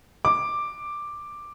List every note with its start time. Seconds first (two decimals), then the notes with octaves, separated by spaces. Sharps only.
0.25 D6